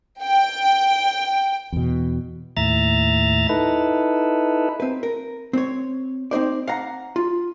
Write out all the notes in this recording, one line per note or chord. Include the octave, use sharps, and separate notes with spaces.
G5
E2 B2
D#2 A2 E5 A#5 A6
D#4 E4 A4 B4
C4 B4
A#4
C4 C#5
C4 D#4 C5 D5
F5 F#5 A#5
F4